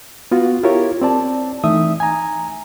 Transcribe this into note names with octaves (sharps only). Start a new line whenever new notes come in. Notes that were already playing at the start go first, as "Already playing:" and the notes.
B3 F4 F#4
E4 F4 G4 A#4 C#5
C4 D5 A5
E3 A3 D#4 E5 D#6
G#5 A#5